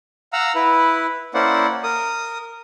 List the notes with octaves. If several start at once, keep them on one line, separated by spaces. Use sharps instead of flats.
F5 F#5 A#5 E6
E4 B4
A#3 C#4 E4 C5 D5 F#5
A#4 D#6